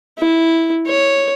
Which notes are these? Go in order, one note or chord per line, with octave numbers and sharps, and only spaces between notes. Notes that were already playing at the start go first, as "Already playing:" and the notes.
E4
C#5